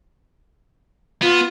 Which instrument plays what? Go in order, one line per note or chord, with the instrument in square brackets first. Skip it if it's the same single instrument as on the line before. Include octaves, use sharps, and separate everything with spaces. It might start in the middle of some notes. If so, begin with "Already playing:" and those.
[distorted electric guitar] B3 [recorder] F4